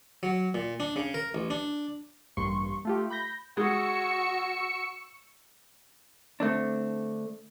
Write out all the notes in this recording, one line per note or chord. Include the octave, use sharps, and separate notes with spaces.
F#3
A#2
D4
C#3
A#4
A1
D4
A1 G2 A#3 C6 C#6
A3 F4 G4
B5 G6 A#6
G#3 F#4 C#6 E6 C#7
D3 A3 C4 D4